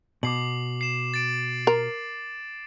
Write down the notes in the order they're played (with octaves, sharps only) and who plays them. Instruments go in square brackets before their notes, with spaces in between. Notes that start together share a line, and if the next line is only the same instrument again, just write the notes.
[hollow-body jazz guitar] B2 [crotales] D6 C7 F#7
[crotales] C7 E7
A6 D7
[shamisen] A#4